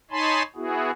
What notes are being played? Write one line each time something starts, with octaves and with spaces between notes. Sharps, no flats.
D#4 C#5 G#5 A5 B5 C6
B3 E4 F#4 G#4